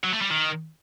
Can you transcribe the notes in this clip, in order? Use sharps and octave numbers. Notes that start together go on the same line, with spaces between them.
F#3
A3
G3
D#3